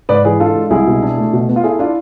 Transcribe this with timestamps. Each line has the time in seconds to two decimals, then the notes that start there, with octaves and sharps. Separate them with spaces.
0.09 G#2 B4 D5
0.24 E3 G#4 B4
0.40 D4 F4 A4
0.55 G#3
0.70 C2 E4 G#4
0.87 B2
1.02 D4
1.18 A3
1.33 B2
1.49 B3
1.56 F4
1.63 E4 G#4 A4
1.79 D4 E4 F4